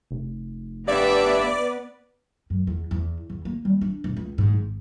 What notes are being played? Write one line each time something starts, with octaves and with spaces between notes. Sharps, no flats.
F1
G2 B3 B4 D5 E5
F#2
E2
E2
E2
A#3
G3
D4
E1
C#2
G#2
G#1